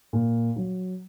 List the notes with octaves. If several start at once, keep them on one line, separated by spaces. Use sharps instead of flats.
A#2
F#3